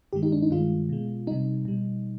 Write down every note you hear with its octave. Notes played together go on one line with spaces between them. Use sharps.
G2 D#3 G#3 G4
D#4
D4
D#4
G2 D#3 G#3 F4
B2 G#3
C3 G3 D#4
B2 G3